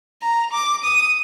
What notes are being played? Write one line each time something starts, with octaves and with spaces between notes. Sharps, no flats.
A#5
D6
D#6